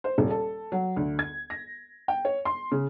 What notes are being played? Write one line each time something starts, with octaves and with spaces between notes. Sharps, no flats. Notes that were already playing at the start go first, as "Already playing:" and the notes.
C5
D#1
A4
F#3
D2
G#6
A#6
G5
C#5
C6
C#3